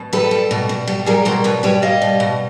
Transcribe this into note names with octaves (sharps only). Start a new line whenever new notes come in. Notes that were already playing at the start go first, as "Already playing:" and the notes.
Already playing: B2
G3 A4 B4
G3
B2
B2
G3
G3 G#4 A#4
B2 A#4 C5
B2 B4 C#5
G3 B4 C#5
G3 D#5 F5
B2
B2